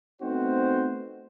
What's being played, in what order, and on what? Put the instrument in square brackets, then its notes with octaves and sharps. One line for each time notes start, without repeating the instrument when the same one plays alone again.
[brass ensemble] A3 B3 C4 D#4 F#4 C5